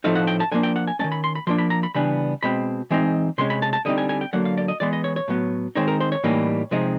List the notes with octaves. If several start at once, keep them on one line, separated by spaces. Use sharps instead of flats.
A2 F3 A3 C4 D#4 F5
F#5
G5
A5
D3 F3 A#3 D4 G#5
G5
F#5
G#5
D#3 G#3 C#4 A5
B5
C6
B5
F3 A#3 D4 C6
B5
A#5
B5
C#3 E3 G3 B3 D4 B5
B2 G#3 C4 B5
E3 G#3 C4 D#4
C3 E3 G#3 C#4 C6
B5
A5
A5
D3 G3 C4 D#4 D#5
G#5
G#5
G5
D3 F#3 A#3 F#5
F5
D5
D#5
E3 G#3 B3 D5
D#5
C#5
C#5
A2 F#3 B3
D#3 G#3 C4 D#4 C#5
A#4
C5
C#5
A2 E3 G3 A#3 D#4
C3 F3 G#3 C4 D#4